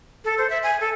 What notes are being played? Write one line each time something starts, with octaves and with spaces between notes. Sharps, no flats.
A4
C5
E5
G#5
A4